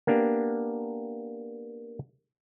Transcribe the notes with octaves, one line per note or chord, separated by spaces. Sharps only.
A#3 B3 D4 G4